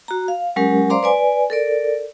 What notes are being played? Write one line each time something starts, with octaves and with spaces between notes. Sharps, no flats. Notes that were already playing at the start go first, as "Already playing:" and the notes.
F#4 A#5
F5
F#3 G#3 C#4 G4 A#4
C5 D5 F5 A#5 C6 D6
B4 D5 G#5
A4 A#4 D5